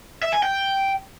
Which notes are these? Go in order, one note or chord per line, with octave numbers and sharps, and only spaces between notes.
E5
G#5
G5